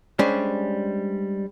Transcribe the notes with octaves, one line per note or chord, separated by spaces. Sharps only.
G3 G#3 C#4 D4 C5